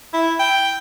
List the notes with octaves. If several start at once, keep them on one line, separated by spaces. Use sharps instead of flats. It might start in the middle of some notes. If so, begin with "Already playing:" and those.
E4
G5